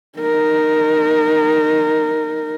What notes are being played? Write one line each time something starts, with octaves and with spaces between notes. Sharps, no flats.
D#4 A#4